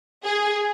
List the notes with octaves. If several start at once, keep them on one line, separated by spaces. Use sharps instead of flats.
G#4